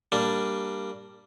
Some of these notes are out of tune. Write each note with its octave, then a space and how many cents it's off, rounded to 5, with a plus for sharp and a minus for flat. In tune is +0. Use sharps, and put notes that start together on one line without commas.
G3 +0 A#3 -15 D4 +0